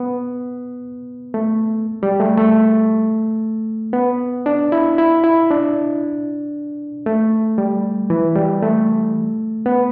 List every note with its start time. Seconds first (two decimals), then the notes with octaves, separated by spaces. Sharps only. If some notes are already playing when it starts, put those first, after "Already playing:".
Already playing: B3
1.34 A3
2.03 G3
2.20 A3
2.38 A3
3.93 B3
4.46 D4
4.72 E4
4.98 E4
5.24 E4
5.50 D4
7.06 A3
7.58 G3
8.10 E3
8.35 G3
8.62 A3
9.66 B3